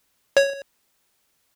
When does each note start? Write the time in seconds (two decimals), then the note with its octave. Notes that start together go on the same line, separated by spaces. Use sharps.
0.37 C#5